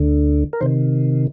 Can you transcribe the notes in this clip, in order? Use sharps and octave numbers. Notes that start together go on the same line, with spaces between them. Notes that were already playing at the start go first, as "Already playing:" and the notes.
Already playing: D2 D3
A#4
C3 D#3 C5